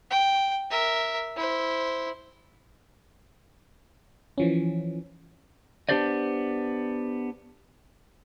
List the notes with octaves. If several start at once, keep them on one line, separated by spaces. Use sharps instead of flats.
G5
A#4 E5
E4 C5
E3 F3 C#4
B3 D4 G4 C5 D5 D#5